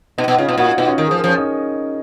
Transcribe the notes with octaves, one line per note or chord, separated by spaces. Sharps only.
B2 D#4 D#5
B2
C#3 F4 F5
B2
A#2 F#4 F#5
F4 F5
B2 D#4 D#5
C#4 C#5
D#3 A#4
G#4
F3
A#4
F3 C#4 C#5
D#4 D#5